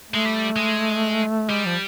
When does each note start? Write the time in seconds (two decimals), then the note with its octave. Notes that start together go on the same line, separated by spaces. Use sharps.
0.10 G#3 A3
0.25 G3
0.56 G#3
1.49 G3 G#3
1.65 F3